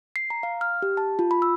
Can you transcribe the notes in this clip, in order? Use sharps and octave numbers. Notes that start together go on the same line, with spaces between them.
C7
A#5
F5
F6
G4
A5
F4
B5
E6